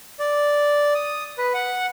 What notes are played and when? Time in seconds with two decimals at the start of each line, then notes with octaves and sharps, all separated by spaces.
0.20 D5
0.95 D#6
1.38 B4
1.54 F#5